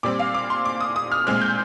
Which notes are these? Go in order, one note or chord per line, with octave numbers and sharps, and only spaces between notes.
A#2 G3 C4 D6
F5
D6
C6
D6
D#6
D#6
F6
A#2 G#3 C4 F6
G6